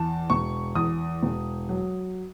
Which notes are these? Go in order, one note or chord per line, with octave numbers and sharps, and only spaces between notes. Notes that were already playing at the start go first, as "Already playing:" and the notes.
Already playing: E2 A5
E1 C#6
E2 D#6
E1
F#3